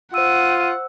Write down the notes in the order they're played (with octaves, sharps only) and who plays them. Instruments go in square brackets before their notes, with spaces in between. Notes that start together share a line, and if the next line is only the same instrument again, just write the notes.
[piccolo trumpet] F4 [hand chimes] C5 E6 [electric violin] F#5 [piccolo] D#7